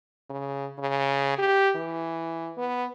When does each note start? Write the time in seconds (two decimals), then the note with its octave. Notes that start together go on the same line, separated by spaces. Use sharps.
0.30 C#3
0.78 C#3
1.38 G4
1.76 E3
2.58 B3